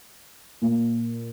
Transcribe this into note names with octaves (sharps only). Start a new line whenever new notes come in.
A#2